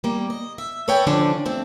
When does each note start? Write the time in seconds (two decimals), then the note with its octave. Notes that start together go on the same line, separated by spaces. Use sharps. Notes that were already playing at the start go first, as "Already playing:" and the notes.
0.04 G3 A#3
0.30 D#5
0.58 E5
0.88 A4 B4 C#5 D#5 G5 G#5
1.07 D3 F3 C#4 D4
1.46 A3 C4 D4